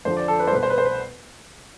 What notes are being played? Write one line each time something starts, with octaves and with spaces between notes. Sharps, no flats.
F2 D3 F3 C5
D5
A4
B4
C5
C2 B2 B4
C5
B4
C5
B4